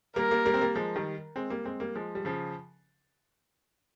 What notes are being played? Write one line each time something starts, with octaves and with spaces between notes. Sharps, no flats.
G3 A#3 A#4
G3 A#3
G3 A#3
C4
G3 A#3
F3 G#3
D#3 G3
G#3 C4
G3 A#3
G#3 C4
G3 A#3
F3 G#3
G3
C#3 F3